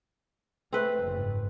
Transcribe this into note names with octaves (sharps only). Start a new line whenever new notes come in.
A3 C4 B4
F#1 G#2